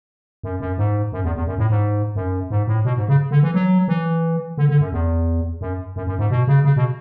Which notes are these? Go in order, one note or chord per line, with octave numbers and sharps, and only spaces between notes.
F#2
F#2
G#2
F#2
E2
E2
F#2
A2
G#2
F#2
G#2
A2
B2
G#2
C#3
D3
E3
F#3
E3
D3
D3
F#2
E2
F#2
F#2
F#2
G#2
B2
C#3
C#3
B2